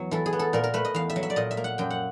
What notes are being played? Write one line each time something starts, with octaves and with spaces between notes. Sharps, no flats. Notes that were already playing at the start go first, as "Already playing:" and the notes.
Already playing: E2 F#3
E3 A4
G#4
B3
A4
A#2 A#4
A#4
A3 B4
D#5
E2 F5
E5
F#3
E5
D5
A#2 D#5
E5
A#3
F#5
F#2 G5
F#5